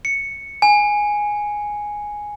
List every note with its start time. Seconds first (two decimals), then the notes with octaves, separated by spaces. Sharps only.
0.05 C#7
0.62 G#5